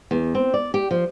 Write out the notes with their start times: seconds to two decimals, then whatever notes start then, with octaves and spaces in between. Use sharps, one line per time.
0.11 E2
0.35 C4
0.54 D5
0.74 G4
0.91 F3